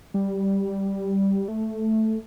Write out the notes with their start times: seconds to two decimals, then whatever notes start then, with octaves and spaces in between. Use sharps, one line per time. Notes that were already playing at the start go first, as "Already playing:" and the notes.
0.14 G3
1.48 A3